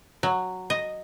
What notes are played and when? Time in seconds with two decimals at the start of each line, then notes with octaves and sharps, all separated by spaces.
0.23 F#3
0.70 D#5